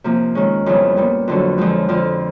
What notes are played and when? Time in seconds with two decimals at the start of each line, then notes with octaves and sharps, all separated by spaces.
0.04 C3 F3 A#3
0.35 D#3 G#3 C#4
0.66 F2 C#3 E3 G3 B3
0.97 A#2 G3 B3
1.28 F2 D3 F#3
1.58 F2 D3 F3 G#3
1.89 F2 D3 F3